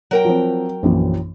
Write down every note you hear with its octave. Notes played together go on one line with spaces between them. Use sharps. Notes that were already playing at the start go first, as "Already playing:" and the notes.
F#3 A#4 G5
F3 C4
A#1 F#2 E3